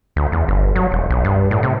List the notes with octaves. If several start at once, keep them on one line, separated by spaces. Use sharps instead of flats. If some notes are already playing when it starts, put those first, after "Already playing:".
D2
E2
G1
F#3
E1
B1
G2
A2
C3